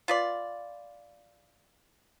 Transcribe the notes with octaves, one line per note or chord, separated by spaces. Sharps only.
F4 B4 D5